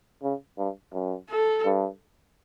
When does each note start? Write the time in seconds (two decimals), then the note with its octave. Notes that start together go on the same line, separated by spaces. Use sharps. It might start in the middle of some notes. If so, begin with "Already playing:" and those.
0.23 C#3
0.58 G2
0.93 F#2
1.30 A4
1.65 G2